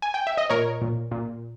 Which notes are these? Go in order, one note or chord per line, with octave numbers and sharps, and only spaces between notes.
G#5
G5
E5
D#5
A#2 A#4 C#5
A#2
A#2